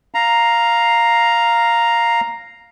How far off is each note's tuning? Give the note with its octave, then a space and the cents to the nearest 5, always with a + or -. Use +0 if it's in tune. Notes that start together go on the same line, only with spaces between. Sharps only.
F5 +0 A#5 +0